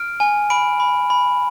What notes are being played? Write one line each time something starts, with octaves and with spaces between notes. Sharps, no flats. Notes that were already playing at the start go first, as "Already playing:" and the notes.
Already playing: F6 D7
G#5
B5 D7
B5
B5